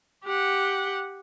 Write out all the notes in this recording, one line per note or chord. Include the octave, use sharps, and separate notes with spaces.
G4 F#5